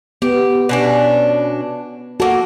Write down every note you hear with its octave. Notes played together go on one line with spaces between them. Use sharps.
B3 G4
B2 C#4 D4
A#3 F#4 A4